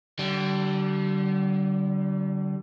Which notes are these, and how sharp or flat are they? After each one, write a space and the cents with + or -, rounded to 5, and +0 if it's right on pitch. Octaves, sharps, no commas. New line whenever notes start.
D3 +0 G3 -40